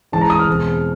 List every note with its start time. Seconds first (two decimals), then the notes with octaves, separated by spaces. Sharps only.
0.12 G#2 E3 G#3 A5
0.21 A#5
0.30 D#6
0.39 F6
0.48 E2 B2 G#3 C4